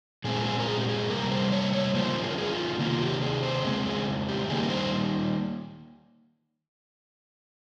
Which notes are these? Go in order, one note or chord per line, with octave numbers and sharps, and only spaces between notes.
A#2 G#3 C4 G#4
A#4
G#4
A#4
G#4
G4
G#4
C3 G3 A#3 A#4
C5
C#5
C#5
C#3 F3 A#3 C5
G#4
A#4
G#4
F4
C3 D#3 A#3 F4
G4
G#4
C5
C#3 G#3 C4 G#4
G#4
G4
D#3 G3 A#3 G#4
A#4
C5